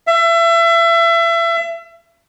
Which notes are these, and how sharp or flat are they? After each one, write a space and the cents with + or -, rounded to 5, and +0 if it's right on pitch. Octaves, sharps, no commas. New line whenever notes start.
E5 +30